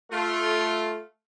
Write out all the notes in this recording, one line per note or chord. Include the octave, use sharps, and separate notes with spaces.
A3 F4